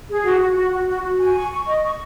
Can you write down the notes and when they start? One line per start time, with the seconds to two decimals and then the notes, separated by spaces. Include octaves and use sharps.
0.09 G#4
0.24 F#4
0.40 F#4
0.56 F#4
0.72 F#4
0.88 F#4
1.04 F#4
1.20 G#5
1.35 C#6
1.51 C#6
1.67 D#5
1.84 C#6